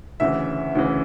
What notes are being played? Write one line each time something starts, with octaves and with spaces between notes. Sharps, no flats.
D2 C#3 E3 E5
D2 C#3 E3